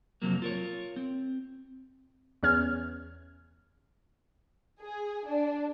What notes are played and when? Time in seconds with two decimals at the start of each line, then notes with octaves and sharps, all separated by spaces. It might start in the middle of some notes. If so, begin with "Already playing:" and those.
0.22 F2 C3 F#3 A#3
0.42 F4 A#4 C#5
0.96 C4
2.43 E2 C#4 F6 G#6
4.81 G#4
5.27 D4